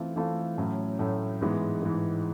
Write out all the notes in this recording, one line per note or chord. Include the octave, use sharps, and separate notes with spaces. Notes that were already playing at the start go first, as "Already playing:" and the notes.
Already playing: E3 A3 C4 F4 A4
E3 A3 C4 F4 A4
A2 F#3 A3 C#4
A2 F#3 A3 C#4
G#2 E3 G#3 B3
G#2 E3 G#3 B3